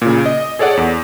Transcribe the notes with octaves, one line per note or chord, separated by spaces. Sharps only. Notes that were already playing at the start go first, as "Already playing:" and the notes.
A#2 C#3
D#5
G#4 A4 C#5 D5 F#5
E2